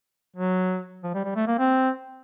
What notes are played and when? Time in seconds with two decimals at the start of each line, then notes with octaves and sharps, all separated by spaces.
0.36 F#3
1.03 F3
1.14 G3
1.24 G3
1.35 A3
1.47 A#3
1.59 C4